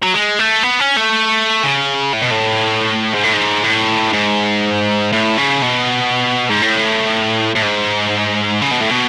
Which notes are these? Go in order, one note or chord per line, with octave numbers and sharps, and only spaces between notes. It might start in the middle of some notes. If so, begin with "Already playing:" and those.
F#3
G#3
A3
B3
C#4
A3
C#3
A2
B2
A2
G#2
A2
G#2
A2
G#2
A2
C#3
B2
G#2
A2
A2
G#2
C#3
B2
A2
B2